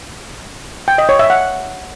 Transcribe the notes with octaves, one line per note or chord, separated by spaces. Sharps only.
G5
D#5
C#5
E5
F#5